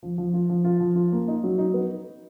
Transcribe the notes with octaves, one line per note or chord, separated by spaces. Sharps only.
F3
F3
F4
F3
F4
F3
F4
A#3
D#4
F#3
D#4
B3